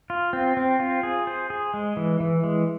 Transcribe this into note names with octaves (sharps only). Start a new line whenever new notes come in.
F4
C4
C4
F4
G#4
C5
G#4
G#3
E3
E3
G#3